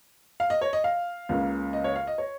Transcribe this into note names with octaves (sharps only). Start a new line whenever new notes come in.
F5
D#5
C#5
D#5
F5
C#2 C#3 A#3 C#4
D#5
C#5
F5
D#5
C#5